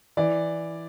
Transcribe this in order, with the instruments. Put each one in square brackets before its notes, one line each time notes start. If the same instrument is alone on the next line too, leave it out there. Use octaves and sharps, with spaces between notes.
[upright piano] E3 D5